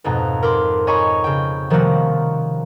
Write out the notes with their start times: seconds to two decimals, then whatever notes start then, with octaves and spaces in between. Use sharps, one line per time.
0.04 F2 G#2 B2 A#5
0.43 A#4 B5 C6 D6
0.87 C#5 D#5 G#5 A#5 B5 C#6
1.24 C#3 G5
1.70 C3 D#3 F3 G3 A#3 F#4